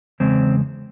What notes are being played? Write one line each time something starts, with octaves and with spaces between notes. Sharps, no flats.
E2 C#3 G#3 C4